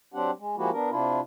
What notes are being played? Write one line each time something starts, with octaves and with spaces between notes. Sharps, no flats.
F#3 C4 D4 G4 F#5
G#3
F3 G#3 A#3 E4 F#4 G4
B3 D4 A#4
C3 D4 E4 F4